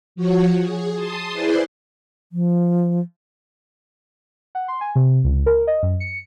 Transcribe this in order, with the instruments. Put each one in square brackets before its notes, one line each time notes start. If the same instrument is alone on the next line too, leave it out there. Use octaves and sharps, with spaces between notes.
[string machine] F3 F#4 C#5
G#4
A5 C6 D#6
E4 G#4 B4 C5 D5 C6
[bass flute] F3
[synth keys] F#5
C6
G#5
C3
C#2
A#4
D#5
F#2
C#7